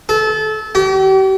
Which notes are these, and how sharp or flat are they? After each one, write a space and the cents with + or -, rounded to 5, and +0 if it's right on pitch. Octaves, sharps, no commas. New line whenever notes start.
A4 -25
G4 -40